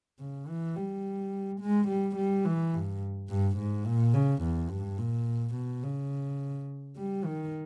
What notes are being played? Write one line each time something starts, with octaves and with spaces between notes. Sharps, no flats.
C#3
E3
G3
G#3
G3
G3
E3
G2
G2
G#2
A#2
C#3
E2
G2
A#2
B2
C#3
G3
D#3